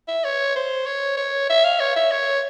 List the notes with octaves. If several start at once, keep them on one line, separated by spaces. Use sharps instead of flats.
E5
C#5
C5
C#5
C#5
E5
F5
C#5
E5
C#5